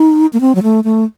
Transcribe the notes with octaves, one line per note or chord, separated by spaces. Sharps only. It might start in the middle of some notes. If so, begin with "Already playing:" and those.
Already playing: D#4
A#3
C4
F#3
A3
A3